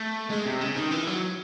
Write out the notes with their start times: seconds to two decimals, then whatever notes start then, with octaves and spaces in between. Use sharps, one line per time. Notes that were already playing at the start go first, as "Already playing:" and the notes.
Already playing: A3
0.30 G#3
0.46 C3
0.61 C#3
0.76 D#3
0.92 E3
1.07 F#3